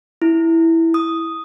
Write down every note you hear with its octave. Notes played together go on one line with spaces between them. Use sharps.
E4
D#6